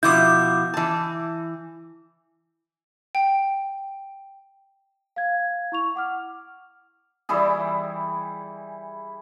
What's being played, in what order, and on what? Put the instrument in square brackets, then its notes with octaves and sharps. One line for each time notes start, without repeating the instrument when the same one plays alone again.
[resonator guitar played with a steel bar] B2 F3 E4 [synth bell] D6 G6
[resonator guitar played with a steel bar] E3 A5
[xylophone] G5
[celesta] F5 G#6
E4 C#6 F7
F#5 D6 F6
[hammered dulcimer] E3 G3 E4 G#4